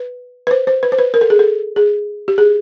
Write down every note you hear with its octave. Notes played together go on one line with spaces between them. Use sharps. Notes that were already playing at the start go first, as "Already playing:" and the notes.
Already playing: B4
B4
C5
C5
B4
C5
B4
A#4
A4
G#4
A4
G#4
G4
G#4